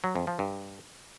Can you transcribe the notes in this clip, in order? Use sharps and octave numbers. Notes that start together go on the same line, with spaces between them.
F#3
F2
F3
G2